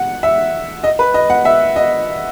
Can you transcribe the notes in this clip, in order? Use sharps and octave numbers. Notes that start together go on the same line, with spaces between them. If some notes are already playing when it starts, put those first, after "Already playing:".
Already playing: F#5
E5
D#5
B4
D#5
F#5
E5
D#5